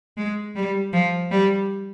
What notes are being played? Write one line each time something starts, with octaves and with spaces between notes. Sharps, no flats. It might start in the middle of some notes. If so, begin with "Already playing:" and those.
G#3
G3
F3
G3